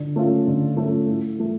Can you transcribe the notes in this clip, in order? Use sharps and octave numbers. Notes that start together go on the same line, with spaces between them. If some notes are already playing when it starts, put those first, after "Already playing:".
Already playing: D3
A3 C#4 F4
D3
A3 C#4 F4
A2
E3 A3